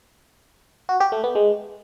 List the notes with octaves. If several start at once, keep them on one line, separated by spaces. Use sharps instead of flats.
F#4
G4
A3
B3
G#3